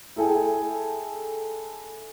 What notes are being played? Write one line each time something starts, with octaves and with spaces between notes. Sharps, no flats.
E4 G#4 A4 G5 G#5